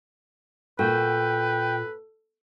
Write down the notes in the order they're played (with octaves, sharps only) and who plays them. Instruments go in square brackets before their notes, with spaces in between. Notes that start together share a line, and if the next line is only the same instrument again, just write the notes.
[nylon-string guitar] A#2 F#4 [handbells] A4 [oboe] B4 [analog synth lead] G5